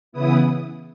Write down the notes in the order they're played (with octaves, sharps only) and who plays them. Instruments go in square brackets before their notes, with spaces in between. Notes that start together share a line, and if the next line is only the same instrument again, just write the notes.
[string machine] C#3 E3 B3 E4 D#6